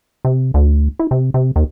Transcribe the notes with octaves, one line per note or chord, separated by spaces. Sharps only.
C3
D2
E4
C3
C3
D#2